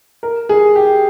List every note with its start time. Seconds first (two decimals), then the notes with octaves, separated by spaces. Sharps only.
0.23 A#4
0.49 G#4
0.75 G4